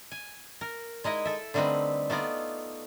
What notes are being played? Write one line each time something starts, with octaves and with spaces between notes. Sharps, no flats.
G#5
A#4
G#3 D#4 E4 D#5
A4 E5
D3 G3 A3 C4 D#4 B4
A3 B3 D#4 F4 D5